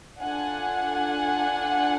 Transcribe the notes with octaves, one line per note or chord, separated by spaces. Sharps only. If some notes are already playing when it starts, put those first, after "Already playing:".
D4 F4 A4 F#5 G#5